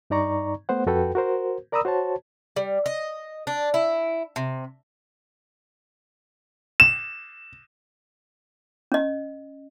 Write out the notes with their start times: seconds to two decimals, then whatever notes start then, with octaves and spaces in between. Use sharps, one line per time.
0.10 G2 D#4 D5 A#5 C#6
0.69 A3 B3 C5 F#5
0.86 F2 F#4 A4 B4 G5
1.15 F#4 A#4 C5
1.72 A#4 D5 A#5 B5 D#6 E6
1.85 F#4 C5 C#5 A5
2.56 G3
2.86 D#5
3.47 D4
3.74 E4
4.36 C3
6.80 E7
8.92 C#4 D#5